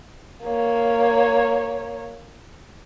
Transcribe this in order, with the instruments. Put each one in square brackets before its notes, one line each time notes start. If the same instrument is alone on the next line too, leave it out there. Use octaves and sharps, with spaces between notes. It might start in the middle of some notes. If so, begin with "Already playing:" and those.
[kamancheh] A#3 C#5